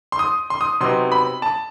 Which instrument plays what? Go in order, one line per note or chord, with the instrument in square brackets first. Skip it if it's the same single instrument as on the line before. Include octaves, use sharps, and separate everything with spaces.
[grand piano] C6
D#6
C6
D#6
C3 F#3 B3 D#4 C6
B5
A5